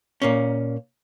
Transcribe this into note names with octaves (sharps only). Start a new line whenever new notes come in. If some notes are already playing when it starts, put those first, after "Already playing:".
A#2 A#3 C#4